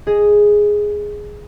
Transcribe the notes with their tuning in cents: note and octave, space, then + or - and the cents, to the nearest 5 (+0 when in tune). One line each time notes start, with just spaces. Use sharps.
G#4 +0 D#5 +0